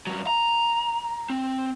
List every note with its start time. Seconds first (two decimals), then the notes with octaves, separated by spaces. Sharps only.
0.07 G2 F#3
0.27 A#5
1.30 C4